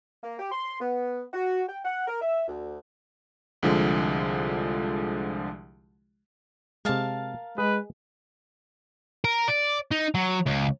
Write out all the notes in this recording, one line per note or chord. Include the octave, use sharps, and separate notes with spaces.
A#3
G4
C6
B3
F#4
G5
F#5
A#4
E5
D2
C2 D3 F3 G#3
C3 G#3 A#4 F5 A5
G#3 G#4 B4 D#5
A#4
D5
D#4
F#3
C#2